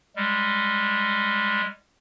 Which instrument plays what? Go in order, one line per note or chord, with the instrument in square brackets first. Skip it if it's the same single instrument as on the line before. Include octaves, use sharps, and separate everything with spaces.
[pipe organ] G3 G#3